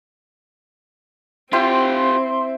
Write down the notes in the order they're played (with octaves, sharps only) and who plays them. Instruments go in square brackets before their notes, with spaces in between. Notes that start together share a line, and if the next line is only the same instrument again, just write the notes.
[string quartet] C4 [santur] E4 C5 [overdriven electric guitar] F4 G4 [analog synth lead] C6